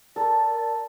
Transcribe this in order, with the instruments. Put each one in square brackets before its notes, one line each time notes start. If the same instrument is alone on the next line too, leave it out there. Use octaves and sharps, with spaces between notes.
[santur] A4 [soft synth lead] A#4 [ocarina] D5